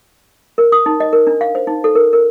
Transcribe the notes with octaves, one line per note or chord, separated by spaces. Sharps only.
A#4
D#6
D#4
D#5
A#4
D4
F5
C5
D#4
A4
A#4
A#4